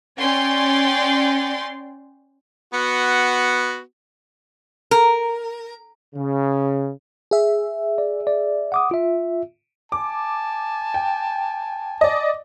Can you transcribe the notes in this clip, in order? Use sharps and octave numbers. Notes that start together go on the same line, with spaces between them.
C#4 D5 G5 C6
B3 F#4
A#4
C#3
G#4 E5
D5
D5
F#5 D6 D#6
F4 E5
G#5 A5 D6
G5
D5 D#5